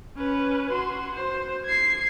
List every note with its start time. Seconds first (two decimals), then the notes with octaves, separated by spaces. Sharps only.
0.17 C#4 B4
0.72 F#4 C6
1.14 C5
1.65 G#6 C7